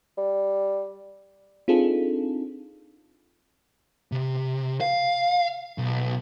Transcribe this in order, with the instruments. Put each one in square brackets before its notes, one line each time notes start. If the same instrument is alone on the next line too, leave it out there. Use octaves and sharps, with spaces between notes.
[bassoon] G3
[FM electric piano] C4 D4 D#4 F4 G#4 A4
[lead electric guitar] C3
F5
B1